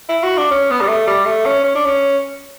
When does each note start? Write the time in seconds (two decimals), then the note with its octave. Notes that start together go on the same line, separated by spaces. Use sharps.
0.09 E4
0.23 F#4
0.38 D4
0.51 C#4
0.70 B3
0.81 G3
0.88 A3
1.07 G3
1.26 A3
1.46 C#4
1.64 C#4
1.75 D4
1.85 C#4